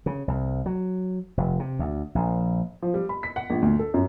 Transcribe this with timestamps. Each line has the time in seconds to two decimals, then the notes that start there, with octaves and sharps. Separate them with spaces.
0.06 C#3
0.28 C2
0.66 F#3
1.37 F1
1.59 C3
1.79 D2
2.15 A#1
2.82 F3
2.94 G3
3.09 B5
3.23 B6
3.36 F#5
3.50 A#1
3.62 D2
3.79 A4
3.94 F#2